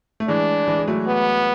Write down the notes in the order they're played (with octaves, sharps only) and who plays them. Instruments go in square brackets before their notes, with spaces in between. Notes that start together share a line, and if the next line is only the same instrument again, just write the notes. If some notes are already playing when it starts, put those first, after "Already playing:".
[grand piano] A3
[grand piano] E3 G#3 [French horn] D4
[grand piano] E3 G#3
G#3
F#3 A3
[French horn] B3